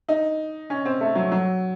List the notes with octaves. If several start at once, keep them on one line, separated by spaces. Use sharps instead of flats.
D#4
C#4
C4
A3
F#3
F#3